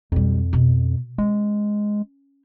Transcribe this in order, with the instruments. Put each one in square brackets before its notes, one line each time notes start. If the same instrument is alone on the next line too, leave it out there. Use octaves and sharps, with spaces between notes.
[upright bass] B1 G3 [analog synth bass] F2
[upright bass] B2
[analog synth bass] G#3 [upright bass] C#4